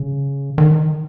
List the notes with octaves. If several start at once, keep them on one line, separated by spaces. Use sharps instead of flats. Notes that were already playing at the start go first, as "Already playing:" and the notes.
Already playing: C#3
D#3